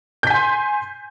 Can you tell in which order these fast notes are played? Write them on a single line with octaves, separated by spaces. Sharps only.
G6 B6 G#5 C6